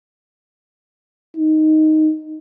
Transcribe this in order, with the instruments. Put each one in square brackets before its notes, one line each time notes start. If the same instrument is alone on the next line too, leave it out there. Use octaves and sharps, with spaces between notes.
[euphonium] D#4